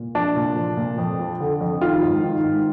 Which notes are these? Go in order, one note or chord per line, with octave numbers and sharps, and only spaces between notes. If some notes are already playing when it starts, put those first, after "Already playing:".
Already playing: A#2
F3 D4
A#2
F3
A#2
F2
F3
D3
F2
D#3 F4
G#2
D#3
G#2